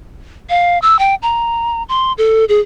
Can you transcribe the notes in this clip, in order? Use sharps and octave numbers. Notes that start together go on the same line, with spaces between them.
F5
E6
G5
A#5
C6
A4
G#4